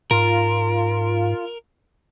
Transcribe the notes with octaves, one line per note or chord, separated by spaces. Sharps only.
G#2 F4 A#4